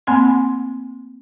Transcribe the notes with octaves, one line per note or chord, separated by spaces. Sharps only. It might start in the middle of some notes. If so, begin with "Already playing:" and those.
A3 A#3 C4 G#5 B5 C6